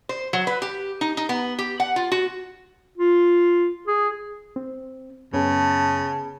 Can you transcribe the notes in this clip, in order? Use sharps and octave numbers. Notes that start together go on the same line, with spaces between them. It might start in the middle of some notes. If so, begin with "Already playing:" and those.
C5
F#3
B4
G4
D#4
D#4
B3
G4
F#5
F4
F#4
F4
G#4
C4
F#2 C#3 B3 C#4 G#4 A5